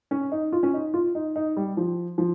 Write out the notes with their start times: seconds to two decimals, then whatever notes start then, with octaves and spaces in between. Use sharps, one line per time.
0.11 C#4
0.32 D#4
0.53 F4
0.63 C#4
0.74 D#4
0.94 F4
1.15 D#4
1.36 D#4
1.57 G3
1.77 F3
2.18 F3